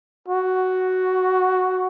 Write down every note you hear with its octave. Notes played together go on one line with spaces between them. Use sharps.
F#4